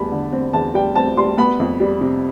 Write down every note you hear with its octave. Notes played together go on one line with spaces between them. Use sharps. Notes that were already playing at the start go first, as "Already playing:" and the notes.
Already playing: E2 G3 A5 B5
D3
C4
E2 A5
G3 G5
C4 A5
G3 C6
B3 B5
F2
G3
C3